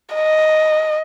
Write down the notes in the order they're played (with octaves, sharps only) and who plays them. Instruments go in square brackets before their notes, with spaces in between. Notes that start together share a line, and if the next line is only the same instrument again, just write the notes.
[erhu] D#5